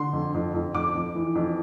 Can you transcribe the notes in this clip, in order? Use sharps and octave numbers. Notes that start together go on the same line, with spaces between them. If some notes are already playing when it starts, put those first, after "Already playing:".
Already playing: D3 C6
F2
F2
F2
F2 D6
F2
E3
F2